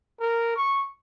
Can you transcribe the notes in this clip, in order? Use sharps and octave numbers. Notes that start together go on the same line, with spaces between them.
A#4
C#6